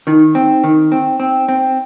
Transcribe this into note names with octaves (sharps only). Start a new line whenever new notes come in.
D#3 D#4
C4
D#3
C4
C4
C4